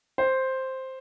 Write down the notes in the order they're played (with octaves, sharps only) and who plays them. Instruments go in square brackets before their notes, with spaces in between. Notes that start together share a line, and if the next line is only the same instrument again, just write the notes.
[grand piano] C5